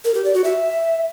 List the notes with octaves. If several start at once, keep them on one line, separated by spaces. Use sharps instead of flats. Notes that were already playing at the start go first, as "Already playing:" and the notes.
A#4
G4
D5
F#4
E5